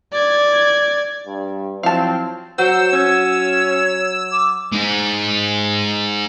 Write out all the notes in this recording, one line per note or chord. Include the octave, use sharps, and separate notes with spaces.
D5 G#6
G2
F3 F#3 C4 E4 F5 A5
F#3 C5 F#5 E6
C#4 G#6
C#5
D6
G#3 D#4